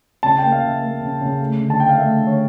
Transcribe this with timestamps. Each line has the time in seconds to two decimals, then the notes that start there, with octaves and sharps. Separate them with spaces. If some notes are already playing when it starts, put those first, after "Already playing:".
0.23 C#3 A5
0.38 A#3 G5
0.52 F5
0.62 C#3 E5
0.82 A#3
1.01 C#3
1.21 C#3
1.40 A3
1.60 D3
1.70 A5
1.78 A3 G5
1.89 F5
1.98 A3 E5
2.18 D3
2.27 C#5